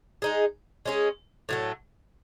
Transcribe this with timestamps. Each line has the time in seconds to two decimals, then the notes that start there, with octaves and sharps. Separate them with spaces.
0.22 G#3 D#4 G#4
0.86 G#3 C#4 G#4
1.49 A2 F#3 A3